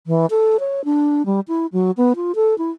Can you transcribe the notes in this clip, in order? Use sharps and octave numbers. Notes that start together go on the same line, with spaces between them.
E3
A4
C#5
D4
G3
E4
F#3
B3
F4
A4
E4